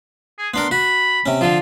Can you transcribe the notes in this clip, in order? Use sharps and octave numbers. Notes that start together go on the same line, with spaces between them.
G#4
B3 D4 A#4 C6
F#4 B5
C3 C#4
D3 F3 F4